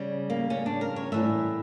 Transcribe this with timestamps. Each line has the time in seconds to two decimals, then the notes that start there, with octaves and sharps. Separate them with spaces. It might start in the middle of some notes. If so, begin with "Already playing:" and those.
Already playing: C#3 G3
0.30 A#3
0.50 C#3 G3 C#4
0.66 D4
0.81 A#4
0.96 C#5
1.12 A2 E3 G3 E5